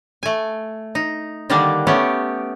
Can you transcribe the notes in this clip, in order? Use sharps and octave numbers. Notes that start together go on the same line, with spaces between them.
A3 G#5
D#4
D3 D#3 G3 A#3 D4
A3 B3 C#4 G4